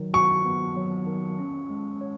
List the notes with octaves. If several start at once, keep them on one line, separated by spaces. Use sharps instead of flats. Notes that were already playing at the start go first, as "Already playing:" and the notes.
Already playing: D#3 F#3
F#4 C#6
B3
F#3
D#3
C#4
G#3
C#5